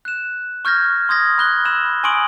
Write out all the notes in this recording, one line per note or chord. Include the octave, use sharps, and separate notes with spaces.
F#6 E7
C#6 F6 G6 G#6 A#6
C6 D#6 G#6 A#6
B5 F#6 G7
B5 E6 E7
G#5 C6 C#6 D#6 D7 F#7